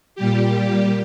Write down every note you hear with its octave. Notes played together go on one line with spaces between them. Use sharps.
A#2 G3 G4